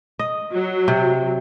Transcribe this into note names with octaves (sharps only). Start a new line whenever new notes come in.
D#5
F#3
C3